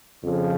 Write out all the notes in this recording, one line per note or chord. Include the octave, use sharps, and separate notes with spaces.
F2 C#3 F3